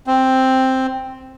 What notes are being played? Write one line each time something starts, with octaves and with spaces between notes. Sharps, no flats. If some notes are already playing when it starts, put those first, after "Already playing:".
C4